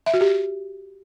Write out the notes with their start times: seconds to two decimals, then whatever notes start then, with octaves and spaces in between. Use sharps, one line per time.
0.06 E5
0.14 F#4
0.21 G4